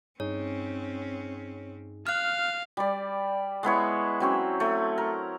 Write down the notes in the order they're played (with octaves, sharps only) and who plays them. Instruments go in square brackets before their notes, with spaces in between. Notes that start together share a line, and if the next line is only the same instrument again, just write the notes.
[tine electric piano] G2 D#4 G#4 [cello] C4 C#4 [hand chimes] C#5
[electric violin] F5 [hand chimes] F6 F#6
[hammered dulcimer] G3 D5
G#3 B3 E4 C#5
F#3 C4 C#4
A3
A#4